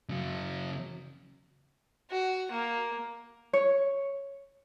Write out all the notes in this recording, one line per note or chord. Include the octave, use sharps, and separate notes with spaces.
C#3 F#3
F#4
A#3
C#5